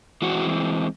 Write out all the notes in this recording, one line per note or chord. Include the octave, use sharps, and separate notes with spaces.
E3 G#3 C4 F#4